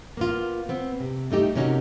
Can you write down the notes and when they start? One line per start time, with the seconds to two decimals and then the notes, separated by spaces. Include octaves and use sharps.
0.17 A#3 B3 F4
0.69 B3 C4
1.00 C3
1.31 G3 A3 D#4 G4
1.56 C3 A#3 C#4 D#4 F#4